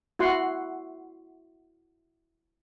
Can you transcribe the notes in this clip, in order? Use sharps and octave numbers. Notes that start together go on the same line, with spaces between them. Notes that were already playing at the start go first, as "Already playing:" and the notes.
E4 F#4 F#5 C6